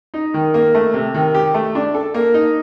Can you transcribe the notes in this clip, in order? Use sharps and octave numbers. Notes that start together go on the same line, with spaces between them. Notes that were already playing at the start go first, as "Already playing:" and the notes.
D#4
D#3
A#3
A3
C3
D#3
G4
A3
D4
A4
A#3
D#4